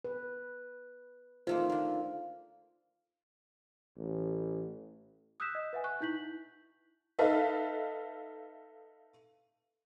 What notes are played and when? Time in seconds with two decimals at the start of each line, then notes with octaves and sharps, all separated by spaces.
0.04 B4
1.47 D#3 A3 A#3 F4 C5
1.70 D3 A#3
3.98 A1
5.40 D#6 E6 F#6 G6 B6 E7
5.55 D#5
5.73 B4 E5 F#5 G#5
5.84 C#6 F#6
6.00 D#4 E4 G6 B6 F#7
7.19 D#4 A4 B4 E5 F5